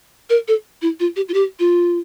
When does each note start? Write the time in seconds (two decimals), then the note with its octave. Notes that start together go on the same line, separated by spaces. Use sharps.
0.30 A#4
0.48 A4
0.82 E4
1.00 F4
1.16 G4
1.29 F4
1.34 G4
1.59 F4